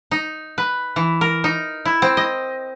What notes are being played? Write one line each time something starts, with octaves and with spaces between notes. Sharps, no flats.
D#4
B4
E3
A#4
D#4
E4
C4
D#5